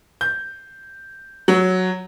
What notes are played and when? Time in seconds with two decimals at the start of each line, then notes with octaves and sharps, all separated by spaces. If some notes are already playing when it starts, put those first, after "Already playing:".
0.21 G6
1.48 F#3